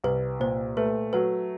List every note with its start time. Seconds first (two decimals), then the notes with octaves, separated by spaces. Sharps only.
0.04 C2 B4
0.40 A#2 C5
0.77 A3 B4
1.13 F#3 B4